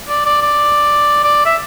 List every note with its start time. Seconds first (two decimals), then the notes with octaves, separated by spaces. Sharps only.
0.09 D5
0.26 D5
0.42 D5
1.24 D5
1.45 E5